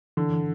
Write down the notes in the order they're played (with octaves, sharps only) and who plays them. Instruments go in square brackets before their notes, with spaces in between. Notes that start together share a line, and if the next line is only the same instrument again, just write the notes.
[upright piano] D3 [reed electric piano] E3